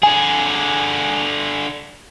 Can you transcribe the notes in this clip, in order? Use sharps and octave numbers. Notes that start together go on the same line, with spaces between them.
D3 G#4 G#5